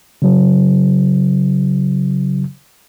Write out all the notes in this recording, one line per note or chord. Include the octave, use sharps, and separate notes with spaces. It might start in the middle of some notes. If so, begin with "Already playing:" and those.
C#3 F#3